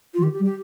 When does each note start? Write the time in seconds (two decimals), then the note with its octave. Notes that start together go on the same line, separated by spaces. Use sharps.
0.14 F4
0.18 F3
0.22 D#3 G4
0.34 G4
0.40 G3
0.45 G4